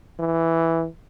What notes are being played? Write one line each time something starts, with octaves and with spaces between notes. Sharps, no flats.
E3